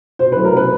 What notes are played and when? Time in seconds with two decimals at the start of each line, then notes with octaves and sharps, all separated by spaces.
0.19 B2 C5
0.32 F#3 A3 C#4 E4 B4
0.45 A#4
0.53 B2 B4